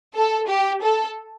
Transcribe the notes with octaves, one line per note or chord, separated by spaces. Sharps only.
A4
G4
A4